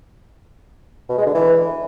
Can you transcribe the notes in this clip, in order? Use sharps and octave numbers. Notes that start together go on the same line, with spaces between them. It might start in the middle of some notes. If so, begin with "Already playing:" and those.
B2
G#3
D3
E3